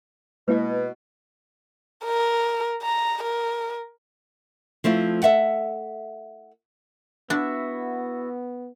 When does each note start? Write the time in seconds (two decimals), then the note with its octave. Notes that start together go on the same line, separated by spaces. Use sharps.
0.48 B2 G#3 A#3 E4 B4 D#5
2.05 A#4
2.82 A#5
3.23 A#4
4.84 F3 A3 C4 E4
5.23 A4 E5 F#5
7.30 B3 D4 E4 F#4 E5